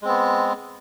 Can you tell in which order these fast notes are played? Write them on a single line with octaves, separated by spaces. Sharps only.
G#3 C4 B3